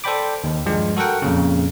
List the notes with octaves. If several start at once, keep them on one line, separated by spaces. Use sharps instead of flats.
A4 C5 D5 G5 B5 D6
D#2
G2 F3 G#3
F#4 A4 A#4 F#5 G5
F2 A#2 C#3